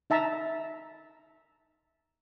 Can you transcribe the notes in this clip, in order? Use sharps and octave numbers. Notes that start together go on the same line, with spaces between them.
D#4 E5 A5 A#5